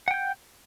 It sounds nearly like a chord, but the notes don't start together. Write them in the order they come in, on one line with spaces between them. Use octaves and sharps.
F#5 G5 G6